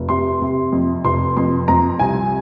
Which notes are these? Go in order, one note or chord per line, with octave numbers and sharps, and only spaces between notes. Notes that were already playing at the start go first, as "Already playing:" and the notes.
Already playing: F1
C3 C6
C3
F2
F1 C6
F2 C6
F2 A#5
C2 G#5